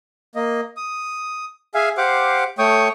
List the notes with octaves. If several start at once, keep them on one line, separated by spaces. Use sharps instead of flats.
A#3 D#5
D#6
G#4 E5 F5 G#5
G4 C5 F5 F#5 D6
A3 C#5 G5 C#6 D#6